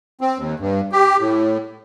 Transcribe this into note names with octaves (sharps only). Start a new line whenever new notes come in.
C4
D#2
G2
G4
A2